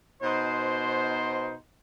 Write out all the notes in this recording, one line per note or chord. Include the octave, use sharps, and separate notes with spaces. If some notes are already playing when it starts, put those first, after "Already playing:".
B2 D#4 C5